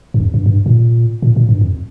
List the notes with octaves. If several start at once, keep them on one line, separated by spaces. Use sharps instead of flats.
G2
F2
G2
G2
A#2
A#2
A#2
G2
F2